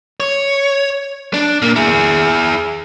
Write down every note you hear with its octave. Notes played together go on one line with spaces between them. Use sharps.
C#5
D4
A#2 A#3
E4 G#4